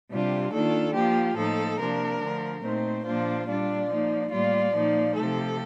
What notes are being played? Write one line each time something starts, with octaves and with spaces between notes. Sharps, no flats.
C3 G3 D4 F4
D#3 A#3 D4 F4 A4
F3 A#3 F4 G4
A2 F3 A#3 D#4 A4
C3 F3 A#3 D4 A#4
D3 F3 A3
A#2 A3 C4 D#4 C5
A#2 F3 A#3 D4 F4 C5
A#2 G3 D4 F4 D5
F3 A#3 D#4
A2 G3 A#3 F4 D5
A#2 F3 A#3 D#4
C3 F3 A3 A4